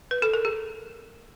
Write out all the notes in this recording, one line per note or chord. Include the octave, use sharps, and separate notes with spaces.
B4
A4
A#4
G#4